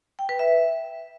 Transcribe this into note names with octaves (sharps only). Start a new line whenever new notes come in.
G5
B4
E5